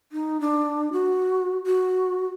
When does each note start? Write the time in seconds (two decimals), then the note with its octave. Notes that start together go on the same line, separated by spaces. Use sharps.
0.12 D#4
0.41 D4
0.93 F#4
1.66 F#4